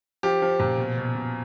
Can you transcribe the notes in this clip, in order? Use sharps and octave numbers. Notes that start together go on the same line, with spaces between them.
F3 G4
F3
A#2
B2
B2
B2